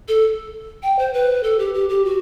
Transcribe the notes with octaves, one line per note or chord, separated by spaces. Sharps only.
A4
G5
C5
B4
A4
G4
G4
G4
F#4